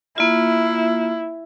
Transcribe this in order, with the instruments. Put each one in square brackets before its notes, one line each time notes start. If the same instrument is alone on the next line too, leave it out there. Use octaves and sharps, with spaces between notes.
[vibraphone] A#3 F4 [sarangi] E4